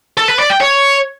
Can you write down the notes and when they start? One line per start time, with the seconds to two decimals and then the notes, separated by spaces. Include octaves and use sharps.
0.17 A4
0.28 B4
0.39 D5
0.50 G5
0.61 C#5